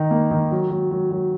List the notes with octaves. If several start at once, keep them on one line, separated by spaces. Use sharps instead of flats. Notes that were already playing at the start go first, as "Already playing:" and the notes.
Already playing: D#3 D#4
A#3
D#3
F#3
F#3
F#3
F#3